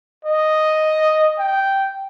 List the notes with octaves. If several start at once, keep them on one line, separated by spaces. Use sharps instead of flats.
D#5
G5